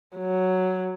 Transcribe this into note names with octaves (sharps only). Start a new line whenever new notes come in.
F#3